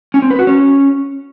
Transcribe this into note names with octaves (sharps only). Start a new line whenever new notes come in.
C#4
C4
B4
F#4
C#4